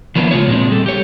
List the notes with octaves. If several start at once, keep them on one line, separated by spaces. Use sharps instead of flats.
F3 F#3 A#3 B3 D4 E4
C#3 G#3 F4 C#5
A#2 G#3 C4 D4
G3 A4
G4 C#5